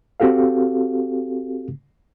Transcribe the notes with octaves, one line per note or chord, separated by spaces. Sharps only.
C4 F#4 G4 A4 F5